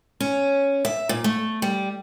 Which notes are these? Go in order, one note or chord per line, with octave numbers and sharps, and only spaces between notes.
C#4
E5
A#2
A3
G3